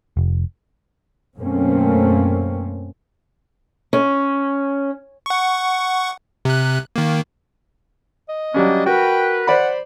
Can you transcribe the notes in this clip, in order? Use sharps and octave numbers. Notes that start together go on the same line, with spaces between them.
F1
F#2 B2 A3 A#3 C4 C#4
C#4
F#5 C#6
C3 F#6
D#3 A#3
D#5
F#3 G3 A#3 C#4 D4
F#4 A#4 B4 G5
C5 D5 F#5 B5